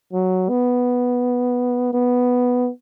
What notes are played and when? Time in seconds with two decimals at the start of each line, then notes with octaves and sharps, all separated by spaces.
0.13 F#3
0.49 B3
1.93 B3